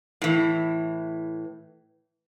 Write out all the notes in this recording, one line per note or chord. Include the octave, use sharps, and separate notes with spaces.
A2 E3